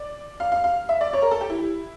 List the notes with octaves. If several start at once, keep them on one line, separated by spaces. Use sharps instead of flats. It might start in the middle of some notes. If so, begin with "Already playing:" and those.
Already playing: D5
F5
F5
F5
E5
D5
C#5
A#4
A4
G4
E4